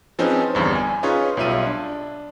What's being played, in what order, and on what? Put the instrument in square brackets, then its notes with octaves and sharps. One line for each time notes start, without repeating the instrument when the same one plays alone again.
[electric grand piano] F3 C4 C#4 D#4 G#4 B4
G1 E2 G2
G#5
C#4 D#4 F4 G#4 B4 C#5
B1 G3 F4 E5 D#7
D4